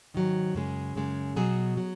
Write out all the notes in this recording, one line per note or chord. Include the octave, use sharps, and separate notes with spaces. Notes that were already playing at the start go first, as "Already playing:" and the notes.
G#2 D#3 F#3
F#2 C#3 G#3
F#2 C#3 G#3
B2 F#3 G#4
F#3